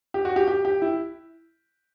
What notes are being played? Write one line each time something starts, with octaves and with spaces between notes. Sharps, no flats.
G4
F#4
G4
G4
G4
E4